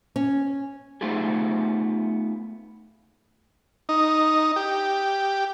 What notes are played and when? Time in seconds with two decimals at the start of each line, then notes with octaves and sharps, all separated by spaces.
0.16 C#4
1.01 A3 B3 D#4 F4 G4 G#4
3.89 D#4
4.56 G4